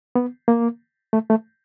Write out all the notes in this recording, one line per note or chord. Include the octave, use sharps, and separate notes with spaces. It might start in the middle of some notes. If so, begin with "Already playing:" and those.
B3
A#3
A3
A3